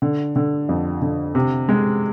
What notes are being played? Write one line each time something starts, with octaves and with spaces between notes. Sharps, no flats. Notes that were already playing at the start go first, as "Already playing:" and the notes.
D3
D3
F2
D3
C3
G#3